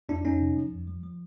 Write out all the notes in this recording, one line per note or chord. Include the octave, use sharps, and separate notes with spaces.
F2 D4 E4
F2 C#4 D#4
C3
F3
F2
F3
F3